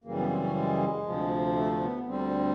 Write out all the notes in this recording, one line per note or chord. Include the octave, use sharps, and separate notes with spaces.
F#2 C#3 E3 G3 A#3
B3
C4
C#4
G#3
D2 C3 F3
A3
B3
D2 D3 G3 C4